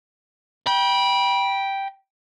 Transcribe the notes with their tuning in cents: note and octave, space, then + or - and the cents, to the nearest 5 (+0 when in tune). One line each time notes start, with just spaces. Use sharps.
G5 +0 B5 -30